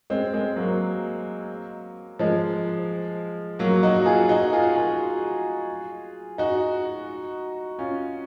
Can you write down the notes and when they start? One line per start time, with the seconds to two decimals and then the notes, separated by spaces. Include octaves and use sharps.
0.10 G#3 C4
0.34 G#3 C4
0.56 F#3 A#3
2.19 F3 G#3
3.59 F#3 A#3
3.83 D#4 F#4
4.06 F4 G#4
4.29 D#4 F#4
4.53 F4 G#4
4.76 F4 G#4
6.38 D#4 F#4
7.78 C#4 F4